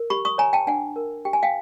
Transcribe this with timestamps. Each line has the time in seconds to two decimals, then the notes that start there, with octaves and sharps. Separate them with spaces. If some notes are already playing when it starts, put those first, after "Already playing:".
Already playing: A#4
0.10 G4 B5 C#6
0.25 C#6 D#6
0.38 C#5 G#5 A#5
0.53 G5 A5
0.67 D4 F#5 G#5
0.96 A#4
1.25 G4 G5
1.33 G#5
1.43 F5 G5